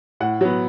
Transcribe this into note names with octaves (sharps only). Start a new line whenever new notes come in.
A2 F#5
F#3 B3